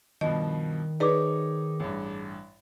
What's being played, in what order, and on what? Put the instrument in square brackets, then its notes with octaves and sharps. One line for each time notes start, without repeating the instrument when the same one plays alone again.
[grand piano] G2 B2 F3 [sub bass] D#3 [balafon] D#5
[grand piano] D#4 C#5 [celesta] G#4 D6 [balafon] B4 D5
[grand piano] A1 G2